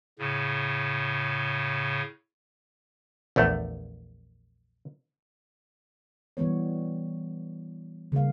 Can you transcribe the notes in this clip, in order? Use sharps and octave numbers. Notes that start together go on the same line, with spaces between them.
A2 C#3
A#1 E2 A3
E3 G3 B3 C#5
C#3 G3 A#3 F5